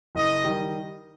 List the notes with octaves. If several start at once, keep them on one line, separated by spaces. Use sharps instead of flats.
F#1 D#5
D#3 G3